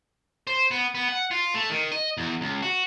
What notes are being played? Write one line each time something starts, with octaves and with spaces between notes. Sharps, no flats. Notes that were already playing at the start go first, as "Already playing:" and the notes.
C5
B3
B3
F#5
F4
A3
D#3
D#5
E2
C#2
F#4